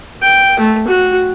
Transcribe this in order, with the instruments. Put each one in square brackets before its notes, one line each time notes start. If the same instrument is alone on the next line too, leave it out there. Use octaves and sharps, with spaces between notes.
[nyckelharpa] G5
A3
F#4